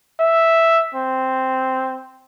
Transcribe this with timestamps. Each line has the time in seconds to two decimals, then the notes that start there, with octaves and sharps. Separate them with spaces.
0.20 E5
0.95 C4